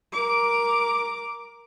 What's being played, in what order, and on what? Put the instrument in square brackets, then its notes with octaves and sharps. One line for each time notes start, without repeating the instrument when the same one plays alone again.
[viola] A#4 D6